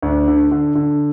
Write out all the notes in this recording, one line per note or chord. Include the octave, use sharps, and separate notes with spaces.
D2 D4
D3
D3
D3